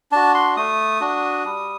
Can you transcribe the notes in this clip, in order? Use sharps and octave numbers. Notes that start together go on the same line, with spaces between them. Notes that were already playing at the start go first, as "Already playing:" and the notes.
D4 F#4 A5
C6
A3 D#6
D4 F#4
G3